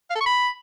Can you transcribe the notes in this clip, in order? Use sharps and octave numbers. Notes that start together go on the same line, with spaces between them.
F5
A4
C#6
B5